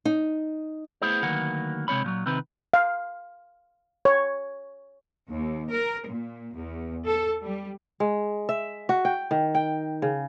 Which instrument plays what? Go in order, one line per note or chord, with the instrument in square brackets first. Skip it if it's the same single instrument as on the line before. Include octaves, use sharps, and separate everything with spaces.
[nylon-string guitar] D#4
[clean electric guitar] A3 B3 E4 G#4 C5
D2 D#3 F#3 A#3 B4 F#5
C3 G#3 C4 C#5 B5
A#2 F3 F#3
C3 D#3 C4 B4
[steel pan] F5
C#5
[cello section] D#2
A#4
A#2
E2
A4
G3
[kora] G#3
E5
F#4
G5
D#3
G5
C#3